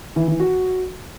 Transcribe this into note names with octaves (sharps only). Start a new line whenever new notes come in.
E3
E3
F#4